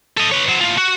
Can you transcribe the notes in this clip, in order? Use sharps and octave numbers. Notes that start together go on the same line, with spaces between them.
A4 D#5
B4 C#5
F#3 C5
A2 F4
F#4